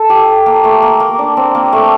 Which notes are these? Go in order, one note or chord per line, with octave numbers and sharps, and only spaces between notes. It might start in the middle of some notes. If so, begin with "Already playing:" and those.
Already playing: A4
G4
A#3
A3
A#3
A#3
D4
C4
A#3
A3